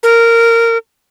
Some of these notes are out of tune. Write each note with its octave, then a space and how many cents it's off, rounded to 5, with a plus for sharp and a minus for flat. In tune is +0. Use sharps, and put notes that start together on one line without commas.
A#4 -15